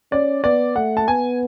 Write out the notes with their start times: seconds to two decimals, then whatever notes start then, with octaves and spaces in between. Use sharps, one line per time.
0.12 C#4 D5
0.44 B3 D5
0.76 A3 F#5
0.97 A5
1.08 B3 G#5